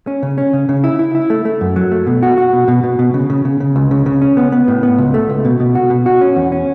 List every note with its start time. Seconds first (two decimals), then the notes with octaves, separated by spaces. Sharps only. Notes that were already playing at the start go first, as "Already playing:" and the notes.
0.07 C#4
0.23 C#3
0.38 C#4
0.53 C#3
0.69 C#3
0.84 E4
0.99 E4
1.15 E4
1.30 A3
1.45 A3
1.61 F#2
1.76 F#3
1.91 A3
2.07 B2
2.23 F#4
2.38 F#4
2.53 B2
2.68 B2
2.83 B2
2.99 B2
3.14 C#3
3.30 C#3
3.45 C#3
3.60 C#3
3.76 C#2
3.91 C#3
4.06 C#3
4.22 C#4
4.37 B3
4.52 B3
4.68 A2
4.83 B3
4.98 C#2
5.14 A3
5.29 C#2
5.45 B2
5.60 B2
5.75 F#4
5.90 B2
6.06 F#4
6.21 C#4
6.36 E2
6.52 C#4